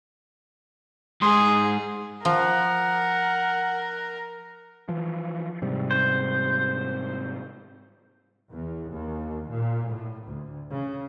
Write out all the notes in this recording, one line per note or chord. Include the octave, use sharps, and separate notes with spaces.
G#2 G#4 C6 D#6
F3 A#4 F#5
E3 F3
G#2 C3 G3
C5
E2
D#2
A#2
A2
D2
C#3